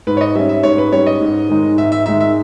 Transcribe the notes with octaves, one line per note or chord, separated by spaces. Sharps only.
G#2 B4
C#5
D#5
G3 C#4 E5
E5
G#2 C#5
B4
G3 C#4 C#5
D#5
G#2
D#3 G#3 D#4
G#2 E5
E5
D#3 G#3 D#4 E5
E5